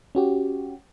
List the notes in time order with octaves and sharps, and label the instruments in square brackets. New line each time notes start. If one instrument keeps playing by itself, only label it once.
[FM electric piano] C#4 F#4 G4